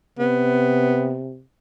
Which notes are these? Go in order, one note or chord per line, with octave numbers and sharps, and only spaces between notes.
C3 B3